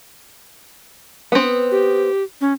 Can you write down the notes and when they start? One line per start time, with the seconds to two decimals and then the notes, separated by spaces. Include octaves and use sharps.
1.32 B3 C4
1.71 G4
2.41 C#4